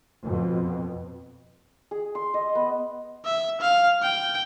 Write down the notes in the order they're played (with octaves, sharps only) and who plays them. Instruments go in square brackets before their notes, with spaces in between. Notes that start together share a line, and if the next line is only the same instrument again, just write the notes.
[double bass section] F2 B2
[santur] G#4
C6
D#5
B3
[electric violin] E5
F5
G5